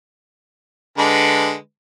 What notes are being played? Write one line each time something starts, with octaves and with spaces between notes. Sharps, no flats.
D3 G#3 B4